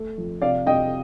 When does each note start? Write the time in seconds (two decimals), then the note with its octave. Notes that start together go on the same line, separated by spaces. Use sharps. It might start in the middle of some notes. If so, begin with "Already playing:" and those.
Already playing: A3
0.18 F2
0.41 C3 D5 F5
0.66 C3 D#5 G5